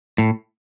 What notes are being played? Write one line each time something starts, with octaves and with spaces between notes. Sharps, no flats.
A2